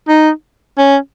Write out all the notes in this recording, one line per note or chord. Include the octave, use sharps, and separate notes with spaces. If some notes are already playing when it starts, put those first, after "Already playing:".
D#4
C#4